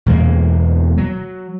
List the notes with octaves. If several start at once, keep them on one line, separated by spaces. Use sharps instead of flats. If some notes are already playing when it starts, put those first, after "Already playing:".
E2 B2 G#3 A#3
F#3